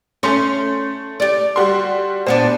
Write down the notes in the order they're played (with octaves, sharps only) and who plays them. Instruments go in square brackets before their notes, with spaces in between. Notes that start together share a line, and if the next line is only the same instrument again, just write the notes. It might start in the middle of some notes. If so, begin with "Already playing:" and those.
[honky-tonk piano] A3 C6 [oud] C#4
[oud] G4 D5
[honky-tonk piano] G3 F#4 C6
[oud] A#2 B3 D4 [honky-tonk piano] C5